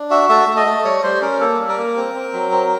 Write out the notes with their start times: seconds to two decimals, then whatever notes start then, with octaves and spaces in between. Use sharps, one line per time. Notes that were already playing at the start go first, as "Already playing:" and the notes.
Already playing: D4
0.10 F#4 E5
0.29 A3 E5
0.47 A3
0.57 D#5
0.66 A3
0.84 G3 C#5
1.03 G3 C5
1.21 C#4 A#4
1.40 A#3 A4
1.59 G3
1.68 A#4
1.78 A#3
1.96 C4
2.14 C4
2.33 F#3
2.52 C4